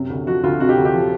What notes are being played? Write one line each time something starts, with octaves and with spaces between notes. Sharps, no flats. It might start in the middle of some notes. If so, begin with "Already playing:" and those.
Already playing: F#2 C3
D2
F3 F#4
D2 F4
C3 F#4
G4
D2
G4
F3